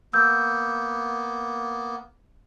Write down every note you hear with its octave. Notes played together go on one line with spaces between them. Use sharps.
A#3 B3 E6 G6